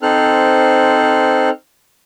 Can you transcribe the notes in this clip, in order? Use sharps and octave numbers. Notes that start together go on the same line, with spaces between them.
C4 D#4 A4 C5 F6 F#6